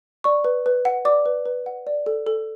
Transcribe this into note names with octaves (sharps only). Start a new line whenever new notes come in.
D5 C#6
B4
B4
F#5
D5 D6
B4
B4
F#5
D5
A4
A4